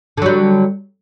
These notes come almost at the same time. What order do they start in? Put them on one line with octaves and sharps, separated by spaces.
D3 F#3 G3